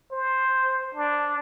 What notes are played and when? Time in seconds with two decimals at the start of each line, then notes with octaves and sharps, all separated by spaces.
0.12 C5
0.95 D4